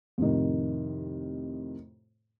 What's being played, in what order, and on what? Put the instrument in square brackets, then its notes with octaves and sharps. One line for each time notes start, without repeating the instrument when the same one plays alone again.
[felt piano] F2 A2 C3 D#3